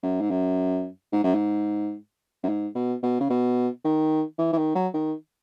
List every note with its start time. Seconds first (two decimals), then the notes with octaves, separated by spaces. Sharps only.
0.03 F#2
0.21 G#2
0.31 F#2
1.13 G#2
1.24 F#2
1.35 G#2
2.44 F#2
2.49 G#2
2.75 B2
3.03 B2
3.20 C#3
3.30 B2
3.85 D#3
4.38 E3
4.53 E3
4.58 D#3
4.75 F#3
4.94 D#3